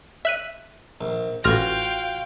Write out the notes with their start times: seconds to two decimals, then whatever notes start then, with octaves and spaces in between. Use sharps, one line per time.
0.25 E5 F#6 D#7
1.01 A#1
1.44 A1 F4 F#4 F5 G5 G#5 F6 A#6